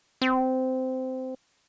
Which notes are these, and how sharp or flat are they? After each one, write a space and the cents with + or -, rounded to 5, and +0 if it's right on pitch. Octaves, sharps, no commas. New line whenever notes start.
C4 -15